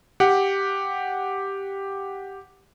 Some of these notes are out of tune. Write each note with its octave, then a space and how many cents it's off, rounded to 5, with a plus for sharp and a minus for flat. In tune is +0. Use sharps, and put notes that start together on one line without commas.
G4 +0 F#5 +0